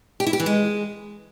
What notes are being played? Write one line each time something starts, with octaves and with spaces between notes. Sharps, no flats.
G4
E4
G4
E3
G#3